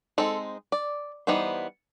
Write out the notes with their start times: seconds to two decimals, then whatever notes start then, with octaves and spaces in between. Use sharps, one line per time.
0.18 G#3 C4 D#4 A4
0.72 D5
1.27 E3 G3 B3 D#4 C5